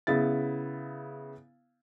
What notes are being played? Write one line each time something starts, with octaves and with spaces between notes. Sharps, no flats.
C#3 B3 E4 A6